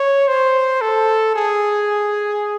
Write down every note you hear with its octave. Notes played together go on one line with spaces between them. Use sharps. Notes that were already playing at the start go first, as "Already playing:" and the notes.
Already playing: C#5
C5
A4
G#4